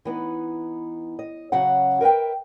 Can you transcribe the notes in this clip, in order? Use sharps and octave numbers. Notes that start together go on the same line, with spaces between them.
E3 B3 D#4
D#5
C#3 F#3 F#4 F#5
A#4 B4 C#5 E5 G5